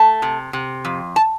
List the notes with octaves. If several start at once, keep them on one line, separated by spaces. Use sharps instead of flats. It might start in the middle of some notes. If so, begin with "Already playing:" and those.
Already playing: A3 A5
C3
C3
F2
A5